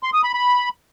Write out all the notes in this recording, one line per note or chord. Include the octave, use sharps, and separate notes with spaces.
C6
D#6
B5
B5